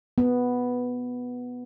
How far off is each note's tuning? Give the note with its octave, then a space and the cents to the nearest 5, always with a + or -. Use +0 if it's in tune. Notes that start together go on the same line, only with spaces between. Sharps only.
B3 +0